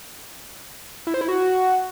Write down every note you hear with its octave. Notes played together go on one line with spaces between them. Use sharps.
E4
C5
E4
F#4